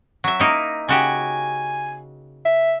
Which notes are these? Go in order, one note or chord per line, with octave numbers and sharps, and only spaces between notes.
F#3 E5
A#3 D#4 E4
C#3 F#4 G4 G#5
E5